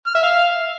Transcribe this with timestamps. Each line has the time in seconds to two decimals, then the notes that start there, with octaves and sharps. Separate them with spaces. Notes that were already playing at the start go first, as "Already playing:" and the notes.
0.07 F6
0.15 E5
0.23 F5